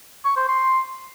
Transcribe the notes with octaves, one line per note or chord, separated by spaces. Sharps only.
C#6
C5
C6